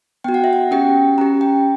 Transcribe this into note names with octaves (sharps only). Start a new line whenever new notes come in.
B3 F#4 G5
F#5
E5
F#5
C#4 G4 G5
C#4 G4 A#5
G5